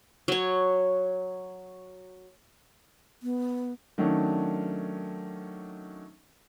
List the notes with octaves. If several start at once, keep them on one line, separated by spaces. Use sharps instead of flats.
F#3 C#5
B3
D#3 F#3 A3 C#4 D4